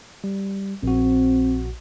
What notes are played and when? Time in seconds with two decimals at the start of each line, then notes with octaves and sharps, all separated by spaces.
0.24 G3
0.83 A#1 C4 F#4